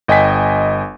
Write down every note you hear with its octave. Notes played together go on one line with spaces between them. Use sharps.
G1 D#5 G5 G#5 B6